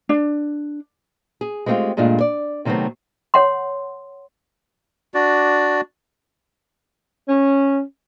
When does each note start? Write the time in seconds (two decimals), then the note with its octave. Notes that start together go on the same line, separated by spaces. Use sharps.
0.09 D4
1.41 G#4
1.66 G#3 A3 C4 D4 F4 G4
1.97 G2 A#2 G#3 A3 D4 F4
2.21 D5
2.65 C3 D#3 F#3 A3 B3 C4
3.34 C#5 F#5 C6
5.14 D4 F#4 D5
7.29 C#4